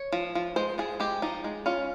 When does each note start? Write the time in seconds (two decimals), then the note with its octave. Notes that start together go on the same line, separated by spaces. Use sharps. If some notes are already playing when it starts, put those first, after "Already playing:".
Already playing: C#5
0.12 F3
0.35 F3
0.56 G#3 C5
0.78 F3 G#4
1.00 G#3 G4
1.22 F3 D#4
1.44 G#3
1.66 C#4 F4